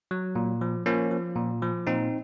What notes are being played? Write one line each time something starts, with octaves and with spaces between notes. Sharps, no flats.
F#3
A#2
F3
F3 A#3 C#4
F3
A#2
F3
A#2 C4 D#4